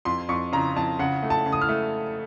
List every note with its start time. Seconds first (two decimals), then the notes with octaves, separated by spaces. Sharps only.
0.05 F2 C6
0.29 F2 C#6
0.53 C#3 A#5
0.76 F2 A5
0.99 C#3 F#5
1.23 A3
1.30 A5
1.46 C#3
1.52 D#6
1.62 F6
1.69 A3